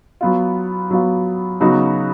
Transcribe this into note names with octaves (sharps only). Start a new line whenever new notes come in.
F#3 B3 F4
F#3 B3 F4
C#3 F#3 B3 D#4 F#4